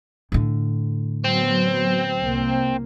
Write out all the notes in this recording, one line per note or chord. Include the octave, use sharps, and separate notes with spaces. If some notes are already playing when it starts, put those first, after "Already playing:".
A2 D3
F#3 B3 C4
C2 A#3